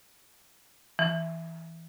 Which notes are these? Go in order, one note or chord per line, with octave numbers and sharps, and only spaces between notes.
E3